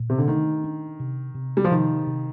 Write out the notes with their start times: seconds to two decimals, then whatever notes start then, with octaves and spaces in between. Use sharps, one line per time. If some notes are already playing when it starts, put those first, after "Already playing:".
Already playing: A#2
0.10 C3
0.18 D3
0.27 D#3 A3
0.64 D4
1.00 C3
1.35 C3
1.57 G3
1.64 F3
1.71 C3 D#3
2.06 C3